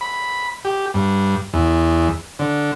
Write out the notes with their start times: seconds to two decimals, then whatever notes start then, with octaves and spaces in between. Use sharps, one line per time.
0.01 B5
0.65 G4
0.94 G2
1.53 E2
2.39 D3